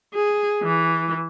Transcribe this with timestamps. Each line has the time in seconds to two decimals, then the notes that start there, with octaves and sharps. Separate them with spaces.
0.14 G#4
0.63 E3